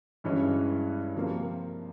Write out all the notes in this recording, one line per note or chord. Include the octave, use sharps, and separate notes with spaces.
G2 E3 G#3 C#4
C3 F3 A#3